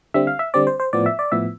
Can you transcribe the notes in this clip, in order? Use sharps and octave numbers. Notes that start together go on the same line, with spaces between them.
D3 G3 C4 E5
F5
E5
D3 G3 C4 D5
C5
C5
A2 F3 B3 D5
E5
D5
A2 F3 B3 E5